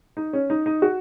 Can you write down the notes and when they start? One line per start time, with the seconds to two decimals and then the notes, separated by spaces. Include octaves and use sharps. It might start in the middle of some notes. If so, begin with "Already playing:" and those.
0.17 D#4
0.33 C#4
0.50 D#4
0.66 D#4
0.82 F#4